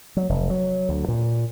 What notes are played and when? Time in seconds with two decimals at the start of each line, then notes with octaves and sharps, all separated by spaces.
0.17 F#3
0.29 F1
0.50 F#3
0.89 D2
1.08 A#2